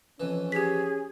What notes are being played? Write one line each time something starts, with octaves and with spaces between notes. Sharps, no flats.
F2 E3 C#4
G4 G#4 B6